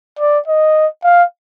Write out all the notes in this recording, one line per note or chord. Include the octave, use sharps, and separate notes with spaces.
D5
D#5
F5